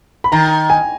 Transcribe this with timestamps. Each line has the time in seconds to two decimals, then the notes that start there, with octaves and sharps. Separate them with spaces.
0.24 B5
0.32 D#3 A#5
0.70 G#5